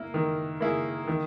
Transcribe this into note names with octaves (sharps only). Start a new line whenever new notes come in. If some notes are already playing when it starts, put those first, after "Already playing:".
Already playing: A#3 E4
D#3
A#3 E4 G#4
D#3